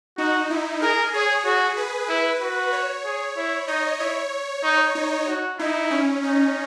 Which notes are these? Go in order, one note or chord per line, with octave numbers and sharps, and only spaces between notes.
D#4 F#4
E4
G#4 A#4
G#4 C#5
F#4 G#4
B4
E4
F#4
C#5
G#4
E4
D#4 D#5
E4 C#5
D#4
D#4
F#4
D#4 E4
C#4
C#4 D#4